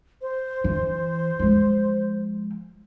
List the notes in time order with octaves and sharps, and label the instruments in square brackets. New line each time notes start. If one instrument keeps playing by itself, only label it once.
[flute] C5
[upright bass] E3
F3 G#3